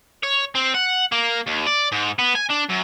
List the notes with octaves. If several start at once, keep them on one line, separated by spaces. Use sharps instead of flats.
C#5
C4
F#5
A#3
D#2
D5
G#2
B3
G#5
D4
F#2